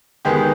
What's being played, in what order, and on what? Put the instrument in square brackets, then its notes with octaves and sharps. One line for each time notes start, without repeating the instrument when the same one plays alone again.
[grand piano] D#3 G#3 B3 G4